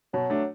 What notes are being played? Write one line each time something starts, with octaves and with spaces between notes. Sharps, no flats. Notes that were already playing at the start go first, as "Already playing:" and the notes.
B2 F#3
A3 D4